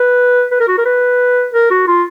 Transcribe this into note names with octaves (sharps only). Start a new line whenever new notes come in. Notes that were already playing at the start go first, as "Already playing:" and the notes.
Already playing: B4
B4
A#4
F#4
A#4
B4
A#4
F#4
F4